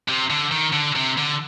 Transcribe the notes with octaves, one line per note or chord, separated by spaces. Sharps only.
C3
D3
D#3
D3
C3
D3